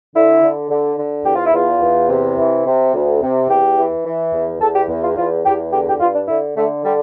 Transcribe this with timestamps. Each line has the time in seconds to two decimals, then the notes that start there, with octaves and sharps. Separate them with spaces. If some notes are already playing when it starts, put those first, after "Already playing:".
0.13 D3 E4
0.41 D3
0.70 D3
0.97 D3
1.25 E2 G4
1.35 F4
1.44 E4
1.53 E2 F4
1.81 E2
2.09 C3
2.37 E3
2.65 C3
2.93 D2
3.21 C3
3.48 E2 G4
3.77 E3
4.05 E3
4.33 E2
4.60 E2 A4
4.74 G4
4.88 E2
5.02 F4
5.16 E2 F4
5.44 E2 G4
5.72 D3 G4
5.86 G4
6.00 G2 F4
6.14 D4
6.28 D3 E4
6.56 D3 A3
6.83 D3 G3